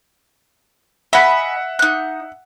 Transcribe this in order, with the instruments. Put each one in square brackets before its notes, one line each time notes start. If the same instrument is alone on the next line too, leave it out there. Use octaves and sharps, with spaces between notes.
[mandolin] D#5 G#5 B5 [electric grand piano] E5 F#5
[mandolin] D#4 F#6